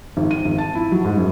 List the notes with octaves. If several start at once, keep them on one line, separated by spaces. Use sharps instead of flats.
G#1
D#7
G#1
A5
E4
F#3
G#2
F#2